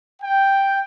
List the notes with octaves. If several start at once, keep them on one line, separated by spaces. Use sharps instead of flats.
G5